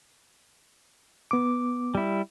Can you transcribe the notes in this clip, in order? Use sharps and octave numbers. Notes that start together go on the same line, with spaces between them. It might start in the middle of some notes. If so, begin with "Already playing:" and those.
B3 D6
G3 E4